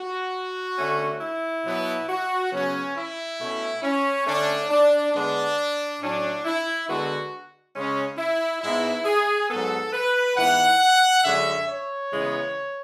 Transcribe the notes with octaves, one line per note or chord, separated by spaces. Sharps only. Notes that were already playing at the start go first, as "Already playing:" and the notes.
Already playing: F#4
D3 A3 C#4
E4
B2 F#3 B3
F#4
C#3 F#3 B3 C#4
E4
B2 A3 C#4
C#4
D3 A3 C#4 D4
D4
D3 G#3 B3 D4
A2 F#3 C#4 D4
E4
D3 G#3 B3 F#4
C#3 G#3 C#4
E4
G#2 G#3 B3 E4
G#4
G#2 F#3 B3 A4
B4
G#2 E3 B3 F#5
F#2 D3 G#3 C#4 E5
C#5
C#3 E3 G#3 B3